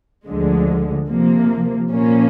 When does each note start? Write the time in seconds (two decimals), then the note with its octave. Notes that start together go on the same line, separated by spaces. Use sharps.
0.25 D2 D3 F3 G#3
1.09 C3 F3 A#3
1.91 A#2 F3 A#3 C#4